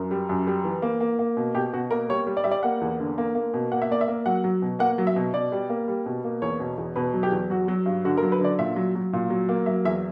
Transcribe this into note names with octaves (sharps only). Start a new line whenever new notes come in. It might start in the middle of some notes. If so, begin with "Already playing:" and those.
Already playing: F#2 A#4
G3
F#2
G3
E3
A#3
A#3
A#3
B2
B2 G4
B2 F#4
A#3 A#4
G3 C#5
G3
D5
G3 E5
D5
A#3 F#5
E2
D3
A#3
A#3
B2
A#3 F#5
E5
A#3 D5
E5
A#3
F#3 F#5
F#3
B2
A#3 F#5
F#3
E5
B2
B2 D5
G3
A#3
G3
B2
A#3
E2 C#5
B2
E2
B2 B4
F#3
G4
E2
F#3 F#4
F#3
G2
D3 F#4
A#4
F#3
B4
D3 D5
A#2 E5
F#3
F#3
A#2
F#3
A#3
F#3 E5
E2 E5